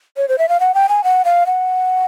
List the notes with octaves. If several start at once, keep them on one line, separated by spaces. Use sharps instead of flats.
C#5
C5
E5
F5
F#5
G5
G#5
F#5
F5
F#5